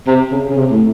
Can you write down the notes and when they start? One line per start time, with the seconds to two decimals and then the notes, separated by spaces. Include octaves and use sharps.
0.07 C3
0.32 C#3
0.49 C#3
0.57 C3
0.71 A2